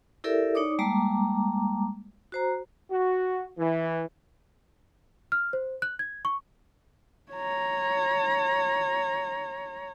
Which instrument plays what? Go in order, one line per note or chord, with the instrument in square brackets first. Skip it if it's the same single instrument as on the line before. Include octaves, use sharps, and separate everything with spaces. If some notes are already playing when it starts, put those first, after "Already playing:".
[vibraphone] E4 G4 A4 A#4 D5 E5
D#4 C#5 D5 D6 D#6
G3 G#3 A#3 A5 A#5 D6
F#4 C5 A#5
[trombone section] F#4
E3
[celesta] F6
C5
F#6
G#6
C#6
[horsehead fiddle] C#5 A#5